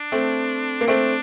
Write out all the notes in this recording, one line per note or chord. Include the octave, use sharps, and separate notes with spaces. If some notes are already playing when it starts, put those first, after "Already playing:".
Already playing: D4
A3 C4
A#3
A3 C4 D4